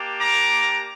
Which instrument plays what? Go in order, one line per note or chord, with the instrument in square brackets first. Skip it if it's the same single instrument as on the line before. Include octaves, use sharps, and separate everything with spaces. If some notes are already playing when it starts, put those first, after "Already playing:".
Already playing: [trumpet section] A#3 D4 G4
A#5 D6